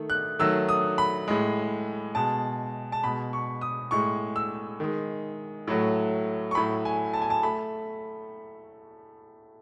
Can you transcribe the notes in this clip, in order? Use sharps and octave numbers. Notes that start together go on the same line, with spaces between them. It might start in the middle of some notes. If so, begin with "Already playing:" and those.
Already playing: D#3 A3
F#6
D#3 F#3 A3 E6
D#6
B5
A2 G#3
B2 G#3 A5
A5
B2 G#3 B5
C#6
D#6
A2 G#3 C#6
E6
D#3 G#3
A2 F#3 A3
C#6
A2 F#3 A3 B5
G#5
A5
G#5
A5
A3 B5